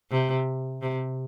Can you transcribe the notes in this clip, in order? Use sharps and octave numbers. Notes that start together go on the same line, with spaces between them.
C3
C3